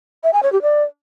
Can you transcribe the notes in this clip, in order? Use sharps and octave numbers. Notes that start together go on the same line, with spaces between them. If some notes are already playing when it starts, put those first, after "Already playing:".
E5
G#5
C#5
G4
D5